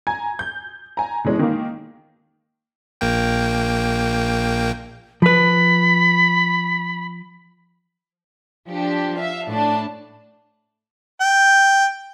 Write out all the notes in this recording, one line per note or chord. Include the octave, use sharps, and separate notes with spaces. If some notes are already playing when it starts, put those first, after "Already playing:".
G#5 A#5 G#6
G6
G#5 A#5
B2 E3 G#3 C#4
D#3 A#3
A#1 A#3 G5
F3 B4 B5
F3 D4 G4
E5 F5
A2 D4 A5
G5